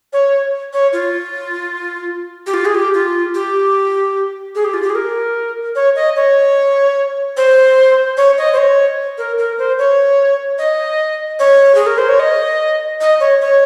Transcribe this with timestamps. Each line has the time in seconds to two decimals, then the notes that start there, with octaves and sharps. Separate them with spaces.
0.13 C#5
0.73 C#5
0.93 F4
2.47 G4
2.54 F4
2.65 G#4
2.75 G4
2.94 F4
3.34 G4
4.55 G#4
4.64 G4
4.74 F4
4.82 G4
4.89 G#4
4.95 A#4
5.75 C#5
5.96 D#5
6.16 C#5
7.37 C5
8.17 C#5
8.38 D#5
8.53 C5
8.57 C#5
9.18 A#4
9.38 A#4
9.58 C5
9.78 C#5
10.58 D#5
11.39 C#5
11.75 G#4
11.86 A#4
11.98 C5
12.09 C#5
12.19 D#5
13.01 D#5
13.20 C#5
13.41 C#5